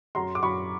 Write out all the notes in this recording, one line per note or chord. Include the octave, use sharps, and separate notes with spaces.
F#2 A#5 C6
D6
F#2 B5 C#6